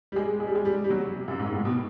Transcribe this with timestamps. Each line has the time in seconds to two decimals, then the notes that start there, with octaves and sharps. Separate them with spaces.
0.12 G3
0.16 G#3
0.40 G#3
0.47 G3
0.55 G#3
0.65 G3
0.84 G3
0.90 F#3
1.15 C3
1.28 F#2
1.40 G#2
1.53 A2
1.65 B2